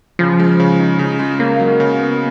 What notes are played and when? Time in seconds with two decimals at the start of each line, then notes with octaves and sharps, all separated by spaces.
0.19 C#3 F3
0.39 G#3
0.60 C#3
0.79 D#4
0.99 C#3
1.19 G#3
1.39 C#3 A#3
1.59 F#3
1.80 C#3
2.00 B3